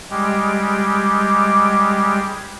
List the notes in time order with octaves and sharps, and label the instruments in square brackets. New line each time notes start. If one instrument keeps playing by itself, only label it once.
[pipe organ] G3 G#3 G4